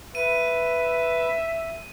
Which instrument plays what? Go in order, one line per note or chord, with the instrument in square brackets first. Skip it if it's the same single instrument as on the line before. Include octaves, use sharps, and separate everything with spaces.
[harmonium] B4 [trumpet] E5 [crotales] D#7